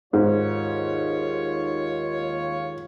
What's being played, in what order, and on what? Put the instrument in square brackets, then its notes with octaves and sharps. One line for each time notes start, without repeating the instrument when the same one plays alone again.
[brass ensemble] D#2 F4 C#5 [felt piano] G#2